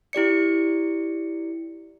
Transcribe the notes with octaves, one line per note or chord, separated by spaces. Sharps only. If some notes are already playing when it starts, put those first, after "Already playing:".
E4 G4 D5 C#7